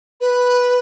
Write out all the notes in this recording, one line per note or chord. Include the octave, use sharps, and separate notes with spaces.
B4